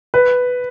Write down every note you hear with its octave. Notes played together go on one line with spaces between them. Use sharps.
B4